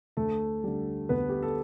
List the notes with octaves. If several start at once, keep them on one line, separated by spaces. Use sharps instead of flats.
D2 A3 A4
D3 G3
D2 B3 B4
G4
A4